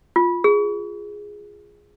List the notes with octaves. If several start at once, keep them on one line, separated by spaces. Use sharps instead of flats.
F4
G#4